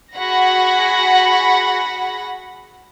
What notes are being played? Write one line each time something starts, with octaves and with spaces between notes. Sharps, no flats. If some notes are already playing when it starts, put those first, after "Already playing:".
F#4 G#4 F#5 B5 A#6